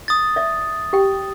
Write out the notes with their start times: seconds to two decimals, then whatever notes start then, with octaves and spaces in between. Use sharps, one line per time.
0.08 D#6 A6
0.36 D5 E5
0.93 G4 G5